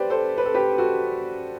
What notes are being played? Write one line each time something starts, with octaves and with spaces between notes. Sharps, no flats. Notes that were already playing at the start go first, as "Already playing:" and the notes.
Already playing: G4 B4 C5 D5
A4 C5
B4
A4
G4 B4
G4
F#4 A4